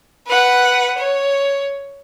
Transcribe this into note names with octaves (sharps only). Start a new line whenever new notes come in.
B4 F#5
C#5